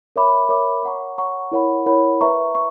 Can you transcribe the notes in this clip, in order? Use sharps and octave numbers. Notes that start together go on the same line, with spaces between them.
A#4 C#5 E5 B5 D6
A#4 C#5 E5 B5 D6
C#5 F#5 A#5 C#6
C#5 F#5 A#5 C#6
E4 A#4 C#5 F#5 B5
E4 A#4 C#5 F#5 B5
B4 E5 A#5 C#6
C#6